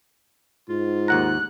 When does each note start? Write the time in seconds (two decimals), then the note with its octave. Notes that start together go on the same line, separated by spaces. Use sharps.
0.69 G#2 F4
1.08 D#2 F#5 A#5 F#6